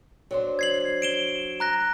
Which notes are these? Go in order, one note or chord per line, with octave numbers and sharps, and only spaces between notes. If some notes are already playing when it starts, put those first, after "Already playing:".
F#3 D4 C5
G#6 C7 F#7
D7 E7 G7
A#5 F#6 A#6